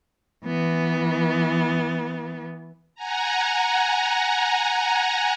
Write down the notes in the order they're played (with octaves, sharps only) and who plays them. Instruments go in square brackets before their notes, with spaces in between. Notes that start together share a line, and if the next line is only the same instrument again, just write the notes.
[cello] E3 B3
[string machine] F#5 G#5 A#5